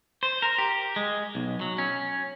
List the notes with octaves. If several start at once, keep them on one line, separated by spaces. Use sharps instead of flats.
C5
A#4
G4
G#3
B1
F#3
C#4